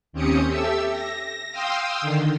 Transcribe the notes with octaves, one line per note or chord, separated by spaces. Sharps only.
D#2 C4 C#4 G4 D#6 C#7
G4 A4 E5 E6
A#6
F5 G5 C6 D#6 E6
D3 D#3